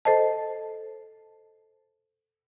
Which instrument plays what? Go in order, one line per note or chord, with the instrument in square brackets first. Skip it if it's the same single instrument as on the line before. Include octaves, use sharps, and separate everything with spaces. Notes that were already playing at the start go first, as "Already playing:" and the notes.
[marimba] A4 C5 D#5 A5